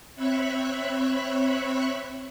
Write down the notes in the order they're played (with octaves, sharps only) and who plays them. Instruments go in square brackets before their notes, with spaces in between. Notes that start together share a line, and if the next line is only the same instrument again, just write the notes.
[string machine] C4 C#5 E5 B5 C#6 F#6